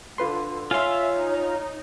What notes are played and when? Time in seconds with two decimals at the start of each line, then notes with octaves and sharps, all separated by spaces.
0.18 D3 F4 B4 C6
0.71 F4 C#5 E5 F5 G#5 C6
1.14 D#4